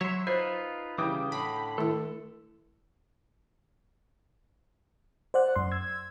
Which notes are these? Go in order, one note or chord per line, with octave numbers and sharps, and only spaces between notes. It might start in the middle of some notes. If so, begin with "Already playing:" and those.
F#3 C#5 E5 C6
D#4 F4 B4 C5 C7
C#3 E3 G3 E4 G5 D6 D#6
A2 D3 B5
D#3 A3 E4 A4
C5 D5 F#5 F#6
F#2 C6
E6 G#6